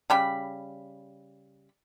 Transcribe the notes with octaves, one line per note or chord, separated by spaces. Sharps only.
C#3 G3 B5